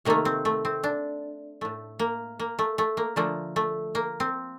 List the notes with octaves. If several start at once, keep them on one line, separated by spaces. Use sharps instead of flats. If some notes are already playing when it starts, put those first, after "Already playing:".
C3 D#3 A3 A#3
C4
A3
C4
D4
A2 A3
A#3
A#3
A3
A3
A#3
D3 F3 A3 A#3
A3
A#3
C4